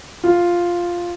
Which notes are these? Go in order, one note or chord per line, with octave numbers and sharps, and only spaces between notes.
F4